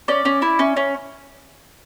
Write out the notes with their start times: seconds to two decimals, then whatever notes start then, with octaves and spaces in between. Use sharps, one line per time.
0.08 C#4 D5
0.25 C#4
0.42 E4
0.59 C#4
0.77 C#4